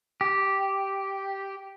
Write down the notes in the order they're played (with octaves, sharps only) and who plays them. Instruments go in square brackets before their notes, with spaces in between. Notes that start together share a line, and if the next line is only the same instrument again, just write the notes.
[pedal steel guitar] G4